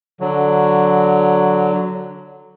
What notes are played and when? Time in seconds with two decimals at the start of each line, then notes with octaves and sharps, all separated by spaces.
0.20 D3 F#3